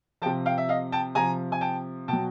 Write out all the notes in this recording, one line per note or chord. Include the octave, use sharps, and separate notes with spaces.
C3 F3 G5 A5
F5 G5
E5
D#5 F5
G5 A5
C3 F3 G#5 A#5
G#5
G5 A5
B2 F#3 G5 A5